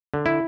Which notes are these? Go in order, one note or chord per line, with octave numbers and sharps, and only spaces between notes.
D3
E4